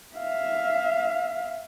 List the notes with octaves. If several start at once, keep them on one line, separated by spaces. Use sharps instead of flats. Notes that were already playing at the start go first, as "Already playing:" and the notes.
E5 F5